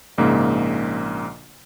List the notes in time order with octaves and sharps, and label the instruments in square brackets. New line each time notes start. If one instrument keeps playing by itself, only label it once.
[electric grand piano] A#1 G#2 C#3 A#3